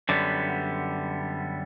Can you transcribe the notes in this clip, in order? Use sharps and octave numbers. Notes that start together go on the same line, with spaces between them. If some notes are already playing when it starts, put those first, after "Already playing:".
F#2 D3 G3 B3